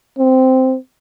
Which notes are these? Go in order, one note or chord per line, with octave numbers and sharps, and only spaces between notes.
C4